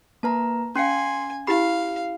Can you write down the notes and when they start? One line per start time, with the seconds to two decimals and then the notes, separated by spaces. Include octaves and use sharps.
0.23 A#3 B4 A5 A#5
0.75 C#4 F5 G#5 C6 C7 C#7
1.47 E4 G4 F5 B5 C7